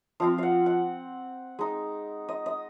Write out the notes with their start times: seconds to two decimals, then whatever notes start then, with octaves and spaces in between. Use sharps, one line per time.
0.20 F3 C4 F4 F5
0.38 F5 F#5
0.66 F#5
1.59 G#3 D#4
2.29 D#5
2.46 D#5